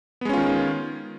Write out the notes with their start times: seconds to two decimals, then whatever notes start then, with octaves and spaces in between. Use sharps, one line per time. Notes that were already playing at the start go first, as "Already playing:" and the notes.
0.21 B3
0.25 G#3
0.29 C#4
0.33 F4
0.37 D#3